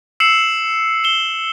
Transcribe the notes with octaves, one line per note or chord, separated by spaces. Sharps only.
E6 C7 C#7 E7 F#7
E7 G7